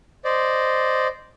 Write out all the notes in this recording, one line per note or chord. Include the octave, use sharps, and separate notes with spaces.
C5 D5 D#5